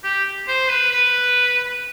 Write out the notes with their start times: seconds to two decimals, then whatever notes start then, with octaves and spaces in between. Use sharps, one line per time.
0.04 G4
0.48 C5
0.70 B4
0.92 B4